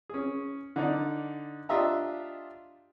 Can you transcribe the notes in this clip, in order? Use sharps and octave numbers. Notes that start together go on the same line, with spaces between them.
C#4 G#4
D3 D#4 D5
D4 F4 G4 D#5 E5 A#5